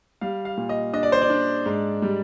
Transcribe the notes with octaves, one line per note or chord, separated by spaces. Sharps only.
G3 F5
F5
A#2
D#5
D4 D#5
D5
C5
D5
D4
G#2
G3